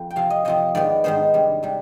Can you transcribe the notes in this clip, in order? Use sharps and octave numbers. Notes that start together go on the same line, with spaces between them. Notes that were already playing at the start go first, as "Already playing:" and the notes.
Already playing: F2
G5
C3 F3 C4 F5
D#5
C3 F3 C4 D#5
G#2 D#3 B3 D5
G#2 D#3 B3 C5
C3 G3 D4
C3 G3 D4